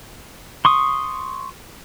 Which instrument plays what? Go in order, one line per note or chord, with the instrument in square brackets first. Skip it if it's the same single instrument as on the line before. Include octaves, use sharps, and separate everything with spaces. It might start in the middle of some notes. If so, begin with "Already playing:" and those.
[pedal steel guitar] C6 C#6 D#6